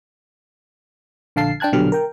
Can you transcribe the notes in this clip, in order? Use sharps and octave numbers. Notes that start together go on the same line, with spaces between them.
A#1 D3 F5 A5 C7
D4 G5 A5 F#6 G#6
A#1 B2 D3 F#3 G4 F6
A#4 G5